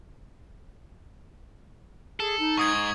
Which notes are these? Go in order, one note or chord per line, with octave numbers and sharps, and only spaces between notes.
G#4 A4
D#4
G#2 C#6 D#6 G#6
C#6